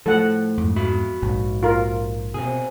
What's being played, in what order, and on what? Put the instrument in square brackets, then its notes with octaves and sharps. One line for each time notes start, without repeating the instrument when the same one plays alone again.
[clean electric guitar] A2 [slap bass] F3 [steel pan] A4 F#5
[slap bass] F2 G#2
[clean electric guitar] F#4 E5 B5
[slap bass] A#1 G#2
[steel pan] F4 A#4
[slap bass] B2 [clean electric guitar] C4 G#4